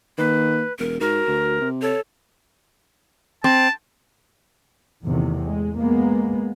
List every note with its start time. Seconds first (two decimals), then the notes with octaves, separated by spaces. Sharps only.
0.18 D#3 A#3 B4
0.79 E1 A#4
1.01 G#2 F#4 A#4
1.27 D2
1.61 C3
1.82 A4 C#5
3.44 C4 A5
5.04 E2 A2 C3 D#3
5.44 G#3
5.77 G#3 A#3 B3